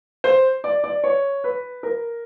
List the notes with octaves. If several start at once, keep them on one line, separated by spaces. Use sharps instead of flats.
C5
D5
D5
C#5
B4
A#4